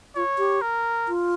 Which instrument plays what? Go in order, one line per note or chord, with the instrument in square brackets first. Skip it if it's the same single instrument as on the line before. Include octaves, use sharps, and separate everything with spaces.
[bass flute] F4 [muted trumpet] C#5
[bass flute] G4
[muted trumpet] A#4
[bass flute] F4